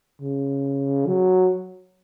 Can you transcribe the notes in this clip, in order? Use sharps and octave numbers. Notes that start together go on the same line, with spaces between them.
C#3
F#3